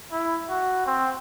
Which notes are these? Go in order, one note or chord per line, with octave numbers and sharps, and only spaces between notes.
E4
F#4
C4